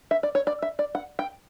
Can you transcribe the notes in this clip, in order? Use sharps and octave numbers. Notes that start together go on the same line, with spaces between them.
E5
D5
C#5
D5
E5
D5
F#5
G5